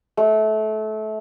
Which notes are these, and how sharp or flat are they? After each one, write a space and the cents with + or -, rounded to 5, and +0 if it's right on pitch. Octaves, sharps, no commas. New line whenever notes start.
A3 -25